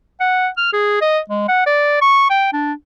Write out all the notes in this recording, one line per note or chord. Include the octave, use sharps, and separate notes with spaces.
F#5
F6
G#4
D#5
G#3
F#5
D5
C#6
G5
D4